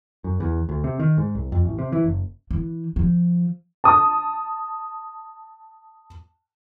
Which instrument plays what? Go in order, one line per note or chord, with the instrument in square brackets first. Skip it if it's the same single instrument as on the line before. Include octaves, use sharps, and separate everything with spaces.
[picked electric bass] F#2
E2
D2
C3
D#3
G#2
C2
F2
A1
C3
E3
F#1
[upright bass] E3
F3
[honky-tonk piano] A5 D#6